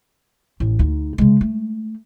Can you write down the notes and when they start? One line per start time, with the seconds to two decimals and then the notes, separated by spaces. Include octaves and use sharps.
0.60 A1
0.79 D2 D#4
1.18 C#3 G#3
1.41 A3